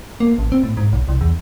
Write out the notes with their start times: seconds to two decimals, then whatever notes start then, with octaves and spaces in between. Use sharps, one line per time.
0.20 A#3
0.38 A1
0.52 C4
0.63 A2
0.77 G#2
0.93 B1
1.08 C2
1.21 E2